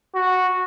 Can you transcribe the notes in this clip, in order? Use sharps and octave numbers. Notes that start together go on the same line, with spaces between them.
F#4